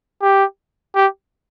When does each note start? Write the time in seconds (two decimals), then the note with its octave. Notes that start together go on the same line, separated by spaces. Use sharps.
0.22 G4
0.96 G4